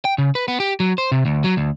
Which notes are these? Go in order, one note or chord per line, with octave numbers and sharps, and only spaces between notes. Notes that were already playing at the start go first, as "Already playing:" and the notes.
G5
C#3
B4
B3
G4
F#3
C5
C3
D2
F#3
D2